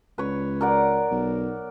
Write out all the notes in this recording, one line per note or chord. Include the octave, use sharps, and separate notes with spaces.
C#2 B4 C#5
A#4 D5 F#5
B1